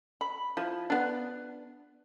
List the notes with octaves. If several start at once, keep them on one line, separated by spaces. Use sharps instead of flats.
B5
F3 E4
B3 D4